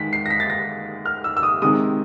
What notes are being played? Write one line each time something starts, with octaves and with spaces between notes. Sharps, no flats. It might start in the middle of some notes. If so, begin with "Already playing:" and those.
Already playing: D#3 G#3 B6
C7
A#6
B6
A6
A#6
F6
E6
E6
D#6
C3 D#3 G#3 D#6